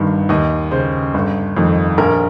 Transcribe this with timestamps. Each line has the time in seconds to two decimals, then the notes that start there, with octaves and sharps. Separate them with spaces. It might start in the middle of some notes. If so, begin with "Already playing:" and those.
Already playing: G1 G2 D#3
0.29 D#2 D#5
0.71 C#3 C5
1.14 G1
1.57 F2 D#3
1.98 A#1 A#4